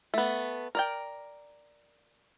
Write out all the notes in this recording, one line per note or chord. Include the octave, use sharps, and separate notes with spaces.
A3 B3
A#4 D5 G5